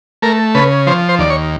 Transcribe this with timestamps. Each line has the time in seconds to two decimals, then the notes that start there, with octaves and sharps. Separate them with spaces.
0.22 A3 A#4
0.55 C#3 B4
0.87 F3 C5
1.09 C5
1.19 D#2 D5
1.30 C#5